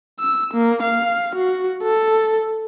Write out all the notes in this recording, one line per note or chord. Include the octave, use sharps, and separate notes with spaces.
E6
A#3
F5
F#4
A4